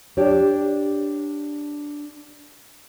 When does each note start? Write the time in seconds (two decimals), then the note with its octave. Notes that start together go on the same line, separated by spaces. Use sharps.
0.17 D4 G4 C#5 D5